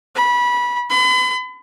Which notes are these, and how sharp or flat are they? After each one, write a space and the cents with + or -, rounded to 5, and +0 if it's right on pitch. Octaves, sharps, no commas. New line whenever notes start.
B5 -20
B5 +40